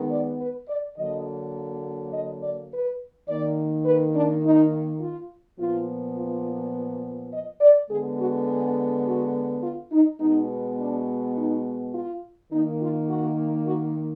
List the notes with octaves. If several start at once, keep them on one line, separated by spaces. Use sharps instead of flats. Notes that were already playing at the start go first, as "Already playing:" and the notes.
Already playing: D#3 G#3 B3
D5
B4
D5
D3 F#3 A#3 D#5
D#5
D5
B4
D#3 A#3 D5
B4
D4
D#4
F4
A#2 F3 B3 F4
F4
D#5
D5
D3 G#3 B3 G#4
F#4
G#4
F#4
F4
D#4
B2 G#3 B3 D#4
D4
D#4
F4
D#3 A#3 D#4
F4
F#4
F#4